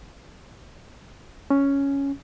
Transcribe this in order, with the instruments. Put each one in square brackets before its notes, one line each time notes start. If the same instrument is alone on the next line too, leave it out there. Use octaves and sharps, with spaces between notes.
[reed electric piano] C#4